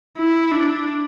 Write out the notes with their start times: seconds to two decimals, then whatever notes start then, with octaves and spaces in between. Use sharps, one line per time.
0.18 E4
0.52 D4